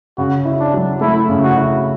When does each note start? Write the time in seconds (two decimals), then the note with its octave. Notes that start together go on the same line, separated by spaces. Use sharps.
0.18 C#3 F#4
0.45 E4
0.60 D4
0.74 F#3
1.01 A3 E4
1.29 C#3
1.43 F#4
1.56 E4